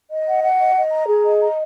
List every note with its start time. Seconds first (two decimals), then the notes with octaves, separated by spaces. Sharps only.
0.10 D#5
0.27 F#5
0.43 F#5
0.59 D#5
0.76 D#5
0.92 A#5
1.08 G#4
1.24 D#5
1.41 A#5